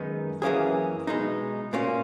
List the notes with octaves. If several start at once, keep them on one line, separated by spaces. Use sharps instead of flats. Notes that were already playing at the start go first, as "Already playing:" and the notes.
Already playing: F#2 D#3 G#3 B3 D#4
F#2 E3 A#3 C#4 G#4
B2 G#3 D#4
A#2 A#3 C#4 F#4